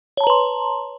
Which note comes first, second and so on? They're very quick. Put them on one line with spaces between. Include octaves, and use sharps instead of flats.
C#5 A5 A#5 B4 C6